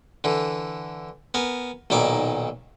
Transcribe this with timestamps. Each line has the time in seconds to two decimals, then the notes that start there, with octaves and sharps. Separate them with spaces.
0.24 D3 E3
1.34 B3 A#4 G#5
1.90 B1 A#2 D#3 E4 D5 D6